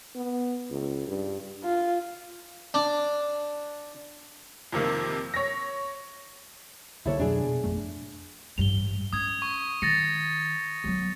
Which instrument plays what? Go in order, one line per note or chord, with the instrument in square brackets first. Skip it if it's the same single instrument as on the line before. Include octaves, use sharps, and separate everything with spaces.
[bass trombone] B3
C#2
G2
[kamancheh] F4
[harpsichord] D4
[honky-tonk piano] F2 C3 D#3 A#3
C#5 A#6
[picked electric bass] C2 D3 A#3 [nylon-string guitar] E4 A4 C#5
[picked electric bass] F2 B2 F#3 [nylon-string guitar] D4 G#4
[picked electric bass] B2
G#1 F2 A3
[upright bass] A1 G2 [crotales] F7 G7
[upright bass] C#4 [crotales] D#6 G#6
[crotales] C#6
[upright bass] D#3 [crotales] A6 A#6 C#7
[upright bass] F#3 B3